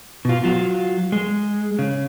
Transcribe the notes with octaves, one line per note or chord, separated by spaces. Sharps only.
B2 F4
F#3 F4
G#3
C#3